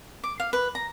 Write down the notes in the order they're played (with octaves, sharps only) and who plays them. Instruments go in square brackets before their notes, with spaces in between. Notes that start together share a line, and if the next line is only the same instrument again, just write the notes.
[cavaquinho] D6
F5
B4
A#5